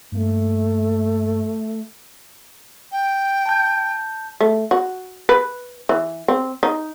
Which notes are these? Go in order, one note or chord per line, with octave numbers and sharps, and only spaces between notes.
G2 A3 A#3
G5
A5 G6
A3
F#4
B4
E3
C4
D#4